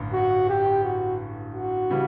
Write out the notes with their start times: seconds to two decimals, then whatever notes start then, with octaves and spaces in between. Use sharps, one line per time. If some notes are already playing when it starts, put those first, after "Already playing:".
Already playing: A1 G2 D3
0.13 F#4
0.49 G4
0.84 F#4
1.54 F#4
1.90 C#3 E3 G3